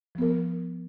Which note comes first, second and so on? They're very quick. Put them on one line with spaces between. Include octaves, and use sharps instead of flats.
F3 B3 A#4